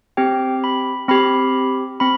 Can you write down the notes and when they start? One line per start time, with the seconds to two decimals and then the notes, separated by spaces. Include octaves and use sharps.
0.17 C4 G4 G5
0.64 B5
1.09 C4 G4 B5
2.00 C4 B5